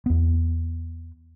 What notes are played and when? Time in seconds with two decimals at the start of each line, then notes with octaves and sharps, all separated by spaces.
0.06 E2 B3